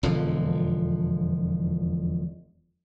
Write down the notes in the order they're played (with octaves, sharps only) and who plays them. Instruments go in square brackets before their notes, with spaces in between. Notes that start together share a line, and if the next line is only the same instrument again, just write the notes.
[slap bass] E1 F2 D3 F3